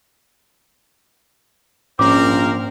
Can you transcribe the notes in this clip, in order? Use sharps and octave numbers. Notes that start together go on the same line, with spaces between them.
A#1 G#2 C4 C#4 A#4 D6